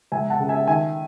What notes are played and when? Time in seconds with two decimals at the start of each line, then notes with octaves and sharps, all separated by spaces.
0.12 C#2 E5 G#5
0.30 F#5 A5
0.39 C#3
0.49 E5 G#5
0.67 D#3 E5 G#5